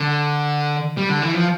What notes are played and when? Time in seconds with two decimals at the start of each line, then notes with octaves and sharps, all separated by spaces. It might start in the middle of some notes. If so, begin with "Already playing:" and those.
Already playing: D3
0.97 G3
1.09 D3
1.22 E3
1.34 F3